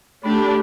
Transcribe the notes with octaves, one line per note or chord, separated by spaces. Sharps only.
A3 D4 G4 B5